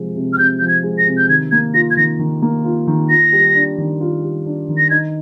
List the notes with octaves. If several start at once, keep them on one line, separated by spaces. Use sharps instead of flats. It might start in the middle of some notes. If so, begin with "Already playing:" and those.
Already playing: C3 F3 G#3
C3
F6
C3 G6
F3 G6
G#6
G#3
A#6
C3
G6
D#3 G#6
A#3 G#6
F4 A#6
G#6
D#3 A#6
D#3
A#3
F4
D#3
F4 A#6
G3
D4
D#3
F4
G3
D4
D#3
A#6
D#4 G#6